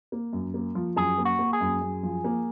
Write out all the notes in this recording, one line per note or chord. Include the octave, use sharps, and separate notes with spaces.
A#3
F#2
A#3
F3
F#2 G#4
A#3
F#4
A#3
G#4
F#2
F#2
F3
A#3